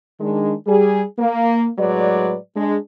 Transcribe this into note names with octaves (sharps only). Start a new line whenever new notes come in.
D#3 G#3 D4
G3 G#4
A#3
A2 F#3 G#3 B4 D5
G#3 D4